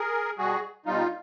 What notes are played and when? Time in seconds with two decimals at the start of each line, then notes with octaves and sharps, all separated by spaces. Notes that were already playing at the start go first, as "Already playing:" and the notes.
Already playing: G#4 A#4
0.38 B2 G3 F#4 G#4
0.86 B2 G3 D#4 F4